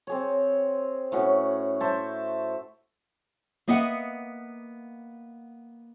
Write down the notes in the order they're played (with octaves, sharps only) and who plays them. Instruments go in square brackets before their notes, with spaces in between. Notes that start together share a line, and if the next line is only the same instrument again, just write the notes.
[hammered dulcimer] C4 G#4 C#5
A2 C#4 F#4
C5 E5 A5 C#6
[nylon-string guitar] A#3 B3 D#5 E5 F#5